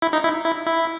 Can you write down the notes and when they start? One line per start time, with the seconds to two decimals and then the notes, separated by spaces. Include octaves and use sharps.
0.02 E4
0.13 D#4
0.24 E4
0.45 E4
0.66 E4